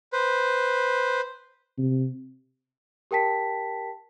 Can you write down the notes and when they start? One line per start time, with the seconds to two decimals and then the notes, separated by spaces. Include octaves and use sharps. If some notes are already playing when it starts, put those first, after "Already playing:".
0.13 B4 C5
1.79 C3
3.11 G4 A#4 G5 A5 B6